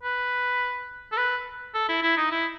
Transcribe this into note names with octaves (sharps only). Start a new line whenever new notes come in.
B4
A4
B4
A4
E4
E4
D#4
E4